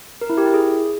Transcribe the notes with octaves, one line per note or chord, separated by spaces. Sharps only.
A#4
E4
G4
E4
G#4